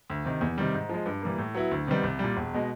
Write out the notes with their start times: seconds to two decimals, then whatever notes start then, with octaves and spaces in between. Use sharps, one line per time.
0.10 D2
0.25 C3 D#3
0.41 E2
0.58 C3 D#3 G3
0.74 G#2
0.89 F3 G#3
1.06 G2
1.22 E3 G3 A#3
1.38 A2
1.55 F#3 B3 E4
1.71 D2
1.87 C3 D#3 G3 B3
2.03 C2
2.19 A#2 G3
2.36 E1
2.54 B2 G#3